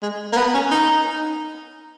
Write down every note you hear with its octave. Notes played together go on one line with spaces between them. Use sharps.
G#3
A#3
B3
C#4
D#4